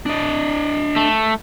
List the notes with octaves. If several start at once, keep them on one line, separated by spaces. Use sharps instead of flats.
D4 D#5
A3